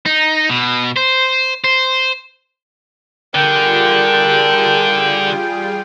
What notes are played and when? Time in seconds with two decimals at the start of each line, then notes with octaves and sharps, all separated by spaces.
0.06 D#4
0.50 B2
0.96 C5
1.64 C5
3.35 D3 G3 F4 G#4 A#4 G5